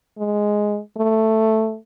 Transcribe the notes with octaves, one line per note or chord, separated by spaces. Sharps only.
G#3
A3